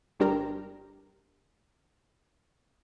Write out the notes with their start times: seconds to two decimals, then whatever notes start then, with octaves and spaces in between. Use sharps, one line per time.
0.20 G1 G2 D4 G4 A#4 A#5